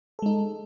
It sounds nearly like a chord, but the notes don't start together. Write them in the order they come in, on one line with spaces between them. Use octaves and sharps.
A4 G#3 D#4